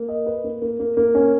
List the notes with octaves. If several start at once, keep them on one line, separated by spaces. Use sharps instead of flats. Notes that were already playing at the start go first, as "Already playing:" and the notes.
Already playing: A#3
D#5
B4
A#3
A#3
A#3
A#3
C#4